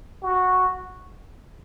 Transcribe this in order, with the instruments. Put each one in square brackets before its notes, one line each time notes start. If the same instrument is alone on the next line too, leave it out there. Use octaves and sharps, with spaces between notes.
[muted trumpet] F#4